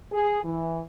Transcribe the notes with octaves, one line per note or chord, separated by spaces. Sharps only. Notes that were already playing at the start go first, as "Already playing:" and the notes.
G#4
E3